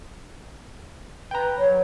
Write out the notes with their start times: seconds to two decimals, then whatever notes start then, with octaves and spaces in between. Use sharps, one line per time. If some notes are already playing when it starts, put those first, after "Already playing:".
1.31 B4 G5 A#5
1.58 F#3 C#5